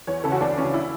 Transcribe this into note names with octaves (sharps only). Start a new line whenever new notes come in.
E2 C#5
C#3 E3 A4
F#4
D2 D4
C#3 E3 C#4
E4